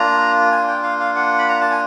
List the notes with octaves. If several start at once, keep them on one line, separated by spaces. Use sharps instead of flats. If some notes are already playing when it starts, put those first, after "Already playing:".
Already playing: A#3 D4 F4 A#5
G#5
G5
F5
F5
F#5
B5
A#5
A5
G#5